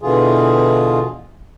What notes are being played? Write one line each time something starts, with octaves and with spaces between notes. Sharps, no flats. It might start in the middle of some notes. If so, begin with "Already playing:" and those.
B2 D3 E3 F4 G#4